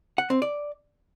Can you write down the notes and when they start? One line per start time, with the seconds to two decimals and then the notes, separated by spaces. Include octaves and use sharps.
0.18 F#5
0.30 C4
0.42 D5